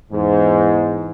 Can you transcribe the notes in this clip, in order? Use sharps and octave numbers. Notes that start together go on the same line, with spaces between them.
E2 G#2